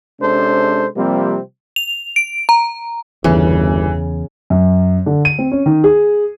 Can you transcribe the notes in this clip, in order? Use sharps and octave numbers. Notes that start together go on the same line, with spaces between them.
C3 G#3 C#4 D4 A4 C5
C3 F3 G3 A#3 C4
F7
D7
A#5
G1 E2 C#3 E3
F#2
D3
D#7
C4
C#4
D#3
G#4